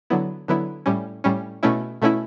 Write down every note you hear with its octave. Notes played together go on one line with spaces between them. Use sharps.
D3 F#3 B3 E4
D3 F#3 B3 E4
A2 G3 C#4
A2 G3 C#4
B2 A3 C#4 E4
B2 A3 C#4 E4